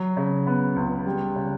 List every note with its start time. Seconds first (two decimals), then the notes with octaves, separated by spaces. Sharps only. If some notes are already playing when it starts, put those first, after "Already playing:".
Already playing: F#3
0.17 C#3
0.47 B3
0.76 C#2
1.06 G3
1.36 C#3